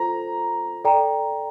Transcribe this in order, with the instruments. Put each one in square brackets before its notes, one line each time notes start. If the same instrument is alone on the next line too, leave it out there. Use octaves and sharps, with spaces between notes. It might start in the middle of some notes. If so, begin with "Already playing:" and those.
Already playing: [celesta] F4 A4 C5 [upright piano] A#5
[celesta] A4 D5 G5 A#5